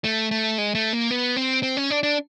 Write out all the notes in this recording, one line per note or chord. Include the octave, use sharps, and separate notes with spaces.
A3
A3
G#3
A3
A#3
B3
C4
C4
C#4
D4
D4